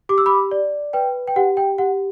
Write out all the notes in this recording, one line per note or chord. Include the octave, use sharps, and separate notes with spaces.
G4 D6
E6
B5 D6
D5
B4 G5
G5
G4 F#5
G5
G4 F#5